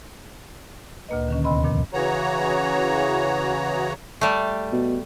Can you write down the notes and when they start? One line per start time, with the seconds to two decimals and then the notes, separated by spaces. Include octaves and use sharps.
1.09 D2 A#2 A#3 B4 D#5
1.28 D3 D#3 C#4
1.44 D#2 C3 B3 D#5 B5 C6
1.64 F#2 A#2 D#3 F3
1.93 C#3 E3 F#4 C#5 A#5
4.21 G3 A3
4.72 B2